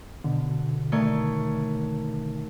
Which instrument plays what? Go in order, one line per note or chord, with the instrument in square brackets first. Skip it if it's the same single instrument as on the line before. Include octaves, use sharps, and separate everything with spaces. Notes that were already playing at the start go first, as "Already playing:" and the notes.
[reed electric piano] B2 D3
[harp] D#3 A3 C#5